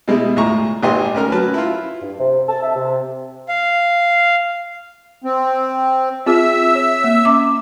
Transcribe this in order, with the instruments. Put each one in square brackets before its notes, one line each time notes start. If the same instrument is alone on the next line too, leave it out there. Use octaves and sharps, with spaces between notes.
[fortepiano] B2 G3 G#3 E4
D2 A2 F4 E5 A#5 C#6
G#1 A#2 G4 D#5 C6
D2 C#4 A#4 F6
F#3 C#4 B4 A5
E4 F4
[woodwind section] G2
C3
A5
E5
C3
[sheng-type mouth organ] F5
[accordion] C4
[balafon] C4 F4 G#4 [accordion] E5 E6
[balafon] C#5
A#3
C#4 D6